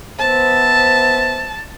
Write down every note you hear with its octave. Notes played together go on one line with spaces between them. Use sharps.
B3 C5 E5 A5